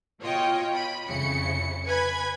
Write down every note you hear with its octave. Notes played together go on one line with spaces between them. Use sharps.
B2 F4 C#5 D#5 G5
B5
F2 C#3 E4 C#7
B4 G#5 B5 G#6